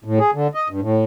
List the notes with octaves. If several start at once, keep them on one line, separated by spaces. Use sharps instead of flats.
A2
G#4
D3
D#5
G2
A2